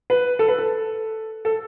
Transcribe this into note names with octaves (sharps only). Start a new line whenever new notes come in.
B4
A4
B4
A4
A4